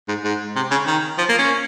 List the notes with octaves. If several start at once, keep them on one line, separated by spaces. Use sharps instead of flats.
G#2
G#2
C3
C#3
D#3
F3
A#3
C#4